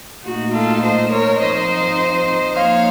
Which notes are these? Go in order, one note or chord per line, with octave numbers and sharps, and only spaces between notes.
A#2 A3 D#4 F#4
F4 A4
C5 D#5
A#4 C#5
F3 C4 D#4 C5 D#5
F3 A#3 D#4 C#5 F5